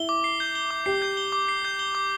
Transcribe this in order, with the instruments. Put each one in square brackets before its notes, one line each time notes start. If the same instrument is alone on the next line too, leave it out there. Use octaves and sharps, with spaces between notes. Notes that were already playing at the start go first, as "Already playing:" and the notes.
Already playing: [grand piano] E4 [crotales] G7
[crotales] D6
C7
G6
G7
D6
[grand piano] G4 [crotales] C7
[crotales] G6
G7
D6
C7
G6
G7
D6